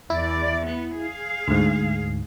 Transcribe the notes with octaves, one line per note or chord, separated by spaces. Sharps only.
E2 E4 D5
B3
G#4 F5
D2 G#2